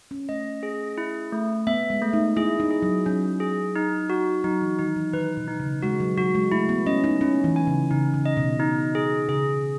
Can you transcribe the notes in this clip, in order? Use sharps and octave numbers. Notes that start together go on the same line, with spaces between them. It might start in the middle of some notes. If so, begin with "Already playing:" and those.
C#4
A3 D#5
G#4
E4
A3
B3 E5
G#3
A3
D#4
E4 G#4
D#4
G#4
F#3
F#3 C#4
G#4
D#4
F#4
F#3 D#4
E3
D#3 D#4
E3
D#3 B4
B2
D#4
C#3
G#3 F#4
F#3
F#3 F#4
G#3
A3 E4
B3
C#4 D#5
D#4
C#4 E4
E3
G#5
C#3
C#3 D#4
C#3
D#5
B2
D#4
G#4
C#3 G#4